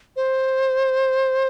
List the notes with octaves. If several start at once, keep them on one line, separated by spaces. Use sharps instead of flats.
C5